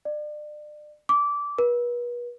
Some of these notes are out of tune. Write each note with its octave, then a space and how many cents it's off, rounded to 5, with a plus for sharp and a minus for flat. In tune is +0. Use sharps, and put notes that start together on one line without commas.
D5 +35
D6 -20
B4 -40